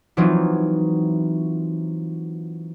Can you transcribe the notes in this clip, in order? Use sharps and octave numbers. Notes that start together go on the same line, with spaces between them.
E3 F#3 A#3 C4 D#4 F4